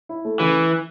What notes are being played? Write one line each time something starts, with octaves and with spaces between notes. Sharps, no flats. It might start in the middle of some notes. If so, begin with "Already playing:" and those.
E4
A3
C#3 E3